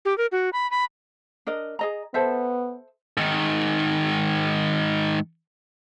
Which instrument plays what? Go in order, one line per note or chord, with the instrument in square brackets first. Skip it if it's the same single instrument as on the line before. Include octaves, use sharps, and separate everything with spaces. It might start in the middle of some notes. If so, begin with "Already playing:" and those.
[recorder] G4
A#4
F#4
B5
B5
[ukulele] D4 A#4 D#5
G#4 D#5 A#5
[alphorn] B3 [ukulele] A4 C5 E5
[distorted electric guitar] G#2 D#3